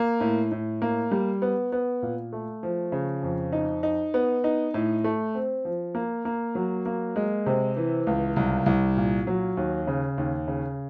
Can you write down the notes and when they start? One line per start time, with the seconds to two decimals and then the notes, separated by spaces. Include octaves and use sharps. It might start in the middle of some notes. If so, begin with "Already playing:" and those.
Already playing: A#3
0.20 A2
0.52 A2
0.82 A#3
1.11 G3
1.42 B3
1.72 B3
2.02 A#2
2.33 A3
2.63 F3
2.92 C#3
3.23 F2
3.53 D#4
3.83 D#4
4.14 B3
4.44 D#4
4.74 A2
5.04 A3
5.35 C4
5.65 F3
5.95 A#3
6.25 A#3
6.55 F#3
6.86 A#3
7.16 G#3
7.46 C3
7.76 E3
8.07 C#2
8.36 C2
8.66 C2
8.97 A#2
9.27 F#3
9.57 D#2
9.87 C#3
10.18 D#2
10.48 C#3